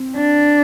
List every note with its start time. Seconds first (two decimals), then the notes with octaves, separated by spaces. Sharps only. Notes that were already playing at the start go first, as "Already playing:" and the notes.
Already playing: C4
0.17 D4